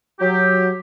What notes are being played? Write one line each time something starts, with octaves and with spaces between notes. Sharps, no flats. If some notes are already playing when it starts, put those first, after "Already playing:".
F#3 G4